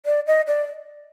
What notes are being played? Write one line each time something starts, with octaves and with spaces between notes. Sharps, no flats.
D5
D#5
D5